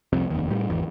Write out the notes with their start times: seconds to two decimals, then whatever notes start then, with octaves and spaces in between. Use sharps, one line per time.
0.13 C2 F2 C3
0.30 F1 D#2
0.50 A2 G3
0.70 G#1 E2